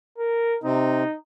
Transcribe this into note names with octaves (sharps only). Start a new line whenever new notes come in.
A#4
C3 C4 D#4